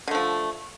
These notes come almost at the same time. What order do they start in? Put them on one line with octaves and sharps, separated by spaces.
D3 A3 F3